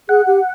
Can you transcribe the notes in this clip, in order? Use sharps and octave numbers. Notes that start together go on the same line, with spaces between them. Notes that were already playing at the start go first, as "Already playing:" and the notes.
G#4 F#5
G4